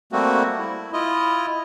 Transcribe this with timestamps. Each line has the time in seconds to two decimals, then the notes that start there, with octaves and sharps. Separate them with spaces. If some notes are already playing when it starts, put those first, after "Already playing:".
0.12 G3 A3 A#3 C4 F#4
0.59 E4
0.93 E4 F4 D#5